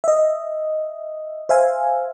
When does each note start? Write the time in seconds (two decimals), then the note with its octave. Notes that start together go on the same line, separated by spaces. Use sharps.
0.04 D#5 E5
1.49 C5 E5 F5 G#5